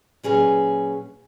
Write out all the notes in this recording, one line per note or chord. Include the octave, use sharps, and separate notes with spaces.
A#2 F#3 C#4 G#4 B4